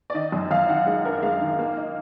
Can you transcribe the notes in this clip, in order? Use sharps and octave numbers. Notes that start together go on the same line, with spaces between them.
D5
D#3 D#5
F#2
F#2 F5
D#3 F#5
G#3 F5
D4 A#4
G#3 F5
D#3
A#3
D#4